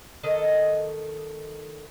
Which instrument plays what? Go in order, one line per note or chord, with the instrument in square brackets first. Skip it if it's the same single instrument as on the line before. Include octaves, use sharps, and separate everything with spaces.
[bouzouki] D#3 A4 D#5